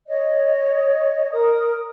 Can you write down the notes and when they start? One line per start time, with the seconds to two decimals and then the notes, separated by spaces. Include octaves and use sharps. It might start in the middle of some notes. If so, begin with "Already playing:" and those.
0.08 C#5 D#5
1.32 A#4 D#6